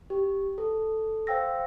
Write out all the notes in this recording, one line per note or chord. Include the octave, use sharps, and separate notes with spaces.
G4
A4
C5 F5 G5 E6 A#6